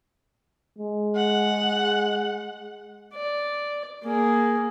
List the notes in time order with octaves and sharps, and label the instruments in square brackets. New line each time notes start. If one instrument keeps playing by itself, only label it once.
[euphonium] G#3
[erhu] F#5
[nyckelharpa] D5
A#3 G#4